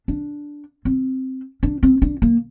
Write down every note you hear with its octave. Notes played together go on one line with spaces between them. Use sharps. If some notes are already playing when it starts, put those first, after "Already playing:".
D4
C4
D4
C4
D4
A#3